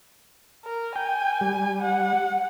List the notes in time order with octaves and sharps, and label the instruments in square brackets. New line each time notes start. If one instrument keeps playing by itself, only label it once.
[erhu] A#4
[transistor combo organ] G5 [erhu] G#5
[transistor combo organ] G3
[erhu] F#5